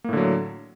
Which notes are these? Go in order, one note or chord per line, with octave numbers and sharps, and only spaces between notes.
A2 D3 F#3 A#3